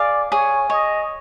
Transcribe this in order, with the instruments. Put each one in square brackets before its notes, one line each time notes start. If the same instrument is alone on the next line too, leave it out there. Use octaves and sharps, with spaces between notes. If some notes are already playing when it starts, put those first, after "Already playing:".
Already playing: [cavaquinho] G#4 F5 [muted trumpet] D5
[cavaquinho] G#4 [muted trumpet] C#5
[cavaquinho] C#5 [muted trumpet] D#5